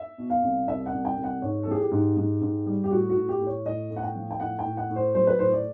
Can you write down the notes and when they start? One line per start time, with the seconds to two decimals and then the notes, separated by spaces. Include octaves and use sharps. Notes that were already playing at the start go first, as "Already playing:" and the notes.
Already playing: E5
0.18 B2
0.30 F5
0.43 C2
0.67 C2 E5
0.86 F#5
0.93 C2
1.05 G5
1.17 C2
1.24 F#5
1.42 G#2 C#5
1.63 A4
1.67 E3 G#4
1.79 G4
1.91 G#2
2.17 G#2
2.41 G#2
2.66 G3
2.84 G4
2.91 A2 F#4
3.09 F#4
3.16 A2
3.29 G4
3.41 A2
3.46 C#5
3.66 A2 D#5
3.90 A2
3.96 F#5
4.03 G5
4.15 F3
4.31 G5
4.40 A2 F#5
4.59 G5
4.65 A2
4.77 F#5
4.89 A2
4.96 C5
5.14 F#3 C5
5.27 B4
5.39 A2 C5
5.52 D5